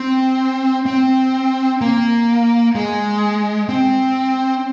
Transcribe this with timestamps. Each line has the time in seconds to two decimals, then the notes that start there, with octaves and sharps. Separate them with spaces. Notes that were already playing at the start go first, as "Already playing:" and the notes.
Already playing: C4
0.86 C4
1.81 A#3
2.75 G#3
3.69 C4